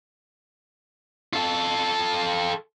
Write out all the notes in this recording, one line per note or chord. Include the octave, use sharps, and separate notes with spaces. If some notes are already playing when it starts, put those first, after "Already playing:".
F4 A4